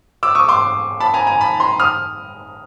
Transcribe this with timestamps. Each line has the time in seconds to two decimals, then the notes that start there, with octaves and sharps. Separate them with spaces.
0.23 D6 E6
0.35 C#6 D#6
0.49 C6 D6
1.00 A5 B5
1.14 G#5 A#5
1.27 G#5 A#5
1.41 A5 B5
1.60 A#5 C6
1.79 D#6 F6